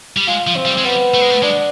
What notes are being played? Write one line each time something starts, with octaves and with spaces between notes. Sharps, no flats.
G3
G#3 F4
F3
C4
G3
G#3
G3 B3
A3
G#3
A3
G#3 D4